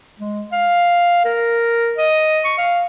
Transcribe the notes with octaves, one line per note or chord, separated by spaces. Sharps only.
G#3
F5
A#4
D#5
C#6
F5